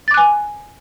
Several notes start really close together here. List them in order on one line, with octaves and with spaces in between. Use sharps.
A6 D6 F#6 G#5